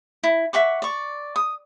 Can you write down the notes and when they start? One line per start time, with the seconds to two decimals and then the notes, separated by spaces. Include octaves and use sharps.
0.23 E4
0.53 E5 F#5 C#6 D6
0.82 D5 C#6
1.36 D#6